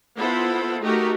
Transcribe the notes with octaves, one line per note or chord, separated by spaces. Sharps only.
B3 E4 F4 A4 C5
A3 D#4 F#4 G4 A4 A#4